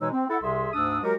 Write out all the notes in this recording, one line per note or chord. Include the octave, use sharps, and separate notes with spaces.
B2 E3 G#3 D#4 C#5 E6
C4
E4 A4 F#5
C2 C3 G#4 E5 C6
D2 G#2 D4 D#6 E6
F#3 G#3 F#4 G4 A#4